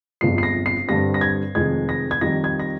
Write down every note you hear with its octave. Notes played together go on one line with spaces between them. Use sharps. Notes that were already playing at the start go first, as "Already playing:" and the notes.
G1 F2 C3 F3 G#3 C7
C7
A#6
C7
G2 D3 G3 C4 A#6
A#6
G#6
F1 F2 D#3 G#3 G#6
A#6
G#6
F2 D#3 G3 A#6
G#6
A#6